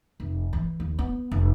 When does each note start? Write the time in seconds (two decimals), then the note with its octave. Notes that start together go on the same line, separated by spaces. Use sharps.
0.20 F1
0.53 E3
0.80 D#2
0.99 B3
1.32 F1